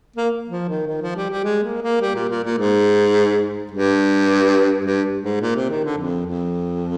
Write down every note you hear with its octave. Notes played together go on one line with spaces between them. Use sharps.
A#3
F3
D#3
D#3
F3
G3
G3
G#3
A#3
A#3
G3
A#2
A#2
A#2
G#2
G2
G2
G#2
A#2
C3
D#3
D3
F2
F2